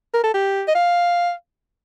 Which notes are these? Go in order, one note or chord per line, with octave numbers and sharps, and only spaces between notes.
A#4
A4
G4
D#5
F5